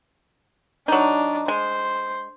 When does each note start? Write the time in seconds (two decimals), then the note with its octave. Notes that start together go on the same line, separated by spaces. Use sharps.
0.88 F#3 D4 D#4
1.48 G#3 C5